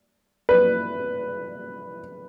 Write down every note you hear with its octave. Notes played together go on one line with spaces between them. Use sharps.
B4